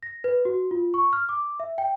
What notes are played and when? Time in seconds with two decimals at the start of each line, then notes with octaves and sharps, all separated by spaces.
0.03 A#6
0.24 B4
0.45 F#4
0.71 F4
0.94 C#6
1.13 F6
1.29 D6
1.60 E5
1.78 G5